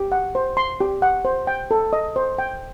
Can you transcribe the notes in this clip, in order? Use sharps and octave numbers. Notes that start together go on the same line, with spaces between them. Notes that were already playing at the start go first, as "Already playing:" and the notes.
Already playing: G4
F#5
C5
C6
G4
F#5
C5
G5
A4
D#5
C5
G5